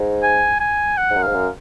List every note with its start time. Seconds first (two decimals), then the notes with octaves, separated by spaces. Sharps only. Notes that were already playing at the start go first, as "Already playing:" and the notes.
Already playing: G#2
0.23 G#5
0.60 G#5
0.97 F#5
1.10 G#2
1.16 F#2
1.23 G#2 F5
1.35 F#2